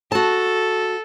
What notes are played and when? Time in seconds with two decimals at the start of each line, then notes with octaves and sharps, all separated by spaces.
0.12 F#4 A4 A5